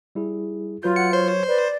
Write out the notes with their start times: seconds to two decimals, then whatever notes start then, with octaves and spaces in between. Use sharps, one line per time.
0.15 G3 E4 G#4
0.83 F#3 F4 B4 G6
0.96 F#5 C#7
1.13 C5 C#5
1.48 B4 D5